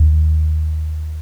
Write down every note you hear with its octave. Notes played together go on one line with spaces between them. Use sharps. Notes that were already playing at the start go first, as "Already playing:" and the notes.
Already playing: D#2